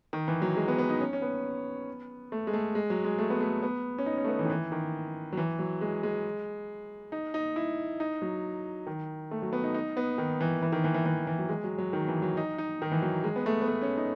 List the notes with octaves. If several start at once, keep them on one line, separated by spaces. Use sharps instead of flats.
D#3
E3
F#3
G#3
B3
B3
D#4
C#4
C#4
B3
A3
G#3
A3
G#3
F#3
G#3
A3
B3
A3
B3
C#4
D#4
C#4
A3
B3
E3
D#3
E3
D#3
F#3
E3
F#3
G#3
G#3
D#4
D#4
E4
D#4
F#3
D#3
A3
F#3
B3
D#4
D#4
B3
D#3
E3
E3
D#3
E3
E3
E3
E3
F#3
G#3
F#3
F#3
D#3
E3
F#3
D#4
D#4
D#3
E3
F#3
G#3
B3
A3
B3
A3
C#4
D#4